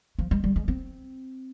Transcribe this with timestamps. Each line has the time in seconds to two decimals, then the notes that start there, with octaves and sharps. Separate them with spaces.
0.19 F3
0.31 G#3
0.44 G3
0.56 G#3
0.68 C4